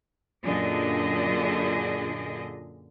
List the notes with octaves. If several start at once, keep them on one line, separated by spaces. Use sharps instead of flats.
F#2 A#2 D3 D4 G#4 D#5